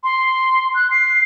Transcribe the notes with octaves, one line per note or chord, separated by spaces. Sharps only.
C6
F#6
C7